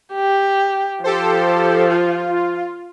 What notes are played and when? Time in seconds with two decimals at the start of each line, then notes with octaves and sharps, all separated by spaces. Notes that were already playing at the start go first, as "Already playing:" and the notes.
0.15 G4
1.04 F3 G4 A4 C5
1.89 F4